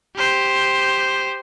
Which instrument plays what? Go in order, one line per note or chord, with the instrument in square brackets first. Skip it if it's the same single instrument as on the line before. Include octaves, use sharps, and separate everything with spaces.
[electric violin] G4 C5